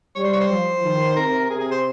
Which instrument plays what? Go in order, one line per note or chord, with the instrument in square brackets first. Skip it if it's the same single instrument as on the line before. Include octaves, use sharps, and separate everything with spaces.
[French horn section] G3 [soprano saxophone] C#5
[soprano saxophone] C5
C#5
C5
[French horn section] F3
D#3
[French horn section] C3 [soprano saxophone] A#4
[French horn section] C3 [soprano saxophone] G#4
[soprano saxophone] G#4
C5